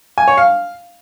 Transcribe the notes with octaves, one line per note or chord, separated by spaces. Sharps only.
G#5
C#5
F5